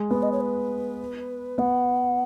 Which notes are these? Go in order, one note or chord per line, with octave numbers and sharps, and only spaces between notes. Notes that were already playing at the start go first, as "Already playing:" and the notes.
Already playing: G#3
B3 B4
D#5
C#5
B4
B3 F#5